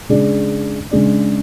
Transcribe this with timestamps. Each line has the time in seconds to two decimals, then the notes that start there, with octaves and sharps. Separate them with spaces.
0.09 C#3 G#3 D4 G#4 D5
0.91 C#3 G#3 D4 G#4 D5